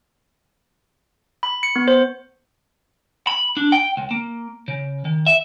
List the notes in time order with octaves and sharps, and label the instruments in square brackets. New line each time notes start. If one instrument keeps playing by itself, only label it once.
[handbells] B5
C#7
B3
C5
[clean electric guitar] B5
D4
G5
C#2
A#3
C#3
D#3
E5